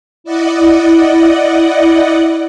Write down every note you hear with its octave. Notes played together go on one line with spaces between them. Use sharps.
E4 D5 D#5 F#5